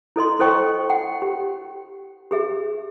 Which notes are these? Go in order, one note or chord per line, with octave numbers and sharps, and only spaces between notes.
E4 A4 D#5 C6
E4 A4 C5 D#5 G5 C#6
F#5 G5
G4
G4 G#4 E5